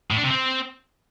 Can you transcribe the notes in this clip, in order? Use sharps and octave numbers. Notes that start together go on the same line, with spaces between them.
A2
D4
C3
C4